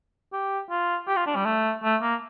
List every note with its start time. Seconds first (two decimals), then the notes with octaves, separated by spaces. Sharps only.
0.33 G4
0.70 F4
1.07 G4
1.17 F4
1.27 D4
1.36 G3
1.45 A3
1.83 A3
2.02 A#3